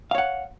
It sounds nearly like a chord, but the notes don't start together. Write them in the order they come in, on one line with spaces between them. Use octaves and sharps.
F5 C#5 F#5